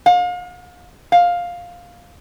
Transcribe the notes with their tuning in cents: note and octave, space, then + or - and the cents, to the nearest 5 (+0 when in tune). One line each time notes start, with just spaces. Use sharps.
F5 +40
F5 +10